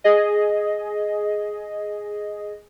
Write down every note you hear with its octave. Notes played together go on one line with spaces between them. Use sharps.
G#4 D#5